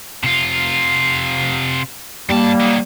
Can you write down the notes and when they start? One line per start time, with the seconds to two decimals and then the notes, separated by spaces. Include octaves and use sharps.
0.24 C3 F4
2.30 G2 G3 A#3 A5
2.60 F#3 D#4